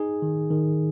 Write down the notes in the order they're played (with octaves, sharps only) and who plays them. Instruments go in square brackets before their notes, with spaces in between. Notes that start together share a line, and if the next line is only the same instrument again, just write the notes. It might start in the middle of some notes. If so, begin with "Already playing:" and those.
Already playing: [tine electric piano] D#4 G#4
D#3
D#3